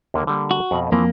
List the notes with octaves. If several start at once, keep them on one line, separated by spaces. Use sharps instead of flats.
D#2 D3 A#3
D3 G3 A#3
F#4
F2 B2 D#5
F2 E3 F3 A#3